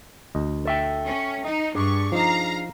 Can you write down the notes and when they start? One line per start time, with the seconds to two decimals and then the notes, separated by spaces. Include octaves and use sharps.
0.35 D2 D#5
0.65 A4 E5 G5
1.06 C#4
1.44 D#4 D#5
1.75 G2 D4 G#4 C#6
2.12 F3 D#4 F5 A#5